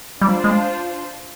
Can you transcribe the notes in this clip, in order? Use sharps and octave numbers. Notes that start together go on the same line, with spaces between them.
G3 D4 F4 C5
G#3